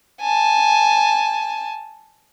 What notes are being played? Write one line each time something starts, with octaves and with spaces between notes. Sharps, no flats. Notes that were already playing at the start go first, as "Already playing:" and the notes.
G#5 A5